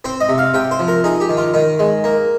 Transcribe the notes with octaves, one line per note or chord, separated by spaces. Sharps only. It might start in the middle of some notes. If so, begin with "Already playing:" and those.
C4 C5
D#5
C3
F5
C3 G5
C5
F3
A#4
D#4 G#4
G4
D#3
F4
D#3 D#4
G#3
A#3